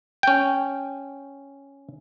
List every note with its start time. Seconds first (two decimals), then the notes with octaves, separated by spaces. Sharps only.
0.23 C#4 G5